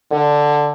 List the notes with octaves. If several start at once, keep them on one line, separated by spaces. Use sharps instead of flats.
D3